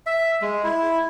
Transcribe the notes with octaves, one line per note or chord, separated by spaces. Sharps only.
E5
G#3
E4